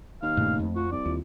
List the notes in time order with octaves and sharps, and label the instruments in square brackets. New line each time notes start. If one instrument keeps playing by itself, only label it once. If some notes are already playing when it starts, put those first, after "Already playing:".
[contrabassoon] D#2 [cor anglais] F5
[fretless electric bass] G2 A#2 C#3 [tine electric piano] A3
[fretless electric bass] F2
[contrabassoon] F3 [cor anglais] F#4
[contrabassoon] C2 [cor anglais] D5
[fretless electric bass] D#2 [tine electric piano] F4